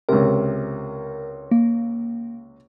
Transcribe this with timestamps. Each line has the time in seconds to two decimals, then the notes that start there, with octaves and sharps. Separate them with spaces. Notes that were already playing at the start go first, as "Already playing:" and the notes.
0.09 C#2 C3 A#4
1.51 A#3